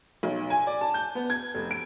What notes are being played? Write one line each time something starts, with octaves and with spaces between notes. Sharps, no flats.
B1
G#5
D5
A5
G6
B3
G#6
F1
D7